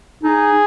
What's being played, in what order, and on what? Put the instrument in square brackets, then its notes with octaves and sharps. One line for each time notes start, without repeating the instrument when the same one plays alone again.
[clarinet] D#4 [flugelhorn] G#4